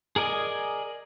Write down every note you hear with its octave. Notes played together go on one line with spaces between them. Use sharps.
G#4 A#4 D5 D#5 G#5